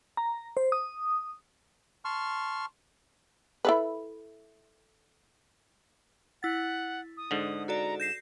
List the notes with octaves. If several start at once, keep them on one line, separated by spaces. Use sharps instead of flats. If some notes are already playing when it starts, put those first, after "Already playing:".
A#5
C5
D#6
A5 C6 C#6 F6
E4 A4 B4
E4 F#5 A6
D#6
G#2 D3
F#4 A4 D5 A#5
G6 A#6 C7 E7